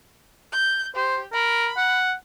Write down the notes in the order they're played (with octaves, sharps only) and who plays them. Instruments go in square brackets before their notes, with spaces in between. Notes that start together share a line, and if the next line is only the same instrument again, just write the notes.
[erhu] G6
[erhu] G4 [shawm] C5
[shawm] A#4 [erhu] B5
[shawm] F#5